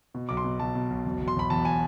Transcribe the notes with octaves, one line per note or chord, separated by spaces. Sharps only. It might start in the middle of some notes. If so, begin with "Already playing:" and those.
B2
B1 D6
C6
B2
B1 A5
B2
B1
E1
E1
C6
E1 B5
E2 A5
G#5